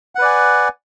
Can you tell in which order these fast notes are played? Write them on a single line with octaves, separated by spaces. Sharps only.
F#5 B4 D5 G#5